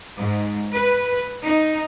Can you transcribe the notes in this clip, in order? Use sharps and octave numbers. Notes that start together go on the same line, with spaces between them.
G#2
B4
D#4